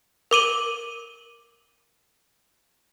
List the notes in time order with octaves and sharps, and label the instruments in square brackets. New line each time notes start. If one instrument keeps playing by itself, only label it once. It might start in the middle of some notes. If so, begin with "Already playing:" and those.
[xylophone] A#4 D6 D#7 F#7